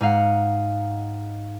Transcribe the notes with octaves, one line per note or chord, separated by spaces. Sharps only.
G#2 D#4 F5 F#5